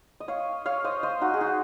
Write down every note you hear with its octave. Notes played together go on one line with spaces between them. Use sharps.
D#5
C#5 F5
C#5 F5
C5 D#5
C5 D#5
D#4 F#4
G#4
D#4 F#4